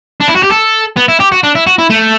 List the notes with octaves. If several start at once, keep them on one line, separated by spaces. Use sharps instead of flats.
D4
E4
F#4
G4
A4
B3
E4
G4
F#4
D4
E4
F#4
E4
A3